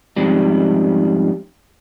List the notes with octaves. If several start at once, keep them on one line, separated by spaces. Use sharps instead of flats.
F2 G#2 G3